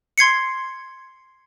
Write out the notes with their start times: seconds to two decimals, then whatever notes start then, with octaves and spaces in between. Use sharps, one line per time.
0.18 C6 G#6 C7 C#7